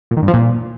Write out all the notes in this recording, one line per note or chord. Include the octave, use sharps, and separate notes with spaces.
A#2
D#3
G2
F3
A#2